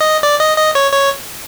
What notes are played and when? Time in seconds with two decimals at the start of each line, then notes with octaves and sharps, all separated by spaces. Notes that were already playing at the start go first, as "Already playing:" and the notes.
0.01 D#5
0.23 D5
0.41 D#5
0.58 D#5
0.75 C#5
0.93 C#5